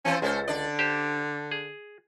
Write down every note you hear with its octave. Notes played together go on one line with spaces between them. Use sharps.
E3 C4 C#4 C5
C#2 G#3 C#4 A4 C5
D3 D4 D5
G4 C5
G#4